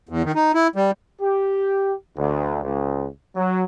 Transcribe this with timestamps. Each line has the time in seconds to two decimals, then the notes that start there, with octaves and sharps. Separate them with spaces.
0.09 E2
0.24 D#3
0.35 D#4
0.55 E4
0.76 G3
1.21 G4
2.17 D2
2.62 C#2
3.36 F#3